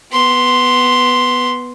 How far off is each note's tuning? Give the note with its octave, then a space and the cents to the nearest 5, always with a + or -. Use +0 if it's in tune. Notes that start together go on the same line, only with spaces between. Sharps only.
B3 +0 C6 +0